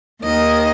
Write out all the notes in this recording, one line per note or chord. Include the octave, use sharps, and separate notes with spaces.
D#2 D#3 A#3 D#5